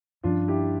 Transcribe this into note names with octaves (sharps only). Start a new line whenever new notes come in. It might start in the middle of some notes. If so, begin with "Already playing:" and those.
G2 F3 C#4 D4 F4
E4 G4